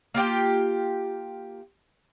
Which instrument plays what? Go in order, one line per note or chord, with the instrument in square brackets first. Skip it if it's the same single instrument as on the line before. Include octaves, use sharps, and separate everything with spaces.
[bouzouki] A#3 F4 G4 G5